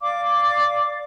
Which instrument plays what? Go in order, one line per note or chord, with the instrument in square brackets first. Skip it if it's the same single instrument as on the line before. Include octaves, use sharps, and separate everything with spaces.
[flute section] D5 F5 D6